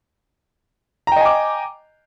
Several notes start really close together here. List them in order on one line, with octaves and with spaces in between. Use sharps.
A#5 G5 D#5 G#5 D6